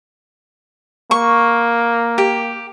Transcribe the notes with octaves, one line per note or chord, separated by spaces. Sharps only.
A#3 C#6
G4